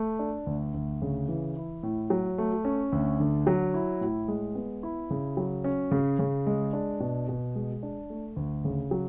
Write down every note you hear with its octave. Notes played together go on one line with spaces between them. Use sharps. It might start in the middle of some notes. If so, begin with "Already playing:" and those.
Already playing: A3
D4
D2
D2
C#3
E3
E4
A2
F#3
A3
C#4
D2
D3
F#3
E4
A2
G#3
B3
E4
C#3
F#3
C#4
C#3
C#3
G#3
D4
B2
B2
G#3
D4
A3
D2
C#3
F#3